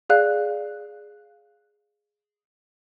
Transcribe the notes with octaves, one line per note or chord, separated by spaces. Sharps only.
G#4 D5 F5 F#6